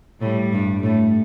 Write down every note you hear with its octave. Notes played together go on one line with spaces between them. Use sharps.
A2 G3
G2
A2 A3